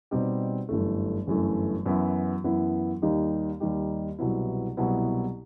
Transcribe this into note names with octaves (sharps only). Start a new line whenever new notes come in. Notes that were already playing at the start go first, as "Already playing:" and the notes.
B2 G3 C4 D#4 G4
G1 F#2 E3 A3
G1 F#2 E3 A3
F#2 E3 B3 E4
F#2 E3 B3 E4
D#2 D#3 G3 D#4 G4
D#2 D#3 G3 D#4 G4
C2 B2 F#3 B3 E4
C2 B2 F#3 B3 E4